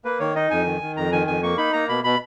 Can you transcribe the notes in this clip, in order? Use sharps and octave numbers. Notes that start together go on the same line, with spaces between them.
A#3 B4
D#3 C#5
D#4 D#5
F2 G#5
D#3
D#3
F2 A#5
D#3 G#5
F2 G#5
A#3 C#6
D#4 B5
A#3 A#5
B2 B5
B2 B5